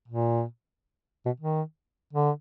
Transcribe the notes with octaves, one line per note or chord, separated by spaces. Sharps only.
A#2
B2
D#3
D3